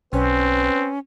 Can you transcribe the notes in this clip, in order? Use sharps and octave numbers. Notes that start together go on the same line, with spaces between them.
B1 C4 C#4 B4